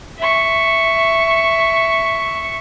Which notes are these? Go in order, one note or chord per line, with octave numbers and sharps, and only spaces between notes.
E5 C#6